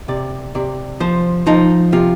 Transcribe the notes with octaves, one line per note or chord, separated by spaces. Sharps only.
C3 D5
C3 D5
F3 C5
F3 D#4
C3 F4